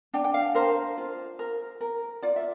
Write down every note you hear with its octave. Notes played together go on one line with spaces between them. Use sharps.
D4 G5
G5
F5
A#4 C5
F4
A#4
A#4
F4 D5
E5